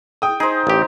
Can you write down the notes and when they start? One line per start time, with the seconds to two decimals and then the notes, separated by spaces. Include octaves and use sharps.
0.22 G5 D#6
0.40 D#4 G#4 C5
0.67 A1 G4